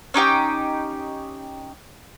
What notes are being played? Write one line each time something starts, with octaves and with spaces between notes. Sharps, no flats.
C#4 D#4 G4 G5